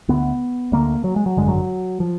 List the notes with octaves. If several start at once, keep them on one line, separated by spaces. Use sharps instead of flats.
D2 D3 B3
D2 D3 A#3
F#3
G#3
F#3
G#1 F#2 D3 G#3
F#3
F3